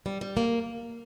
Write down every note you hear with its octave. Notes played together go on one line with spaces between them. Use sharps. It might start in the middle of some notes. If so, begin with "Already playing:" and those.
G3
G3
A#3